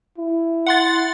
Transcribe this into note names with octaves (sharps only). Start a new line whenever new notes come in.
E4
F#5 C6 A6